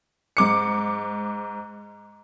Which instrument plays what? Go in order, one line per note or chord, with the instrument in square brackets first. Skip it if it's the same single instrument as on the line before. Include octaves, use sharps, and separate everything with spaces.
[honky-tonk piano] G#2 D6 C#7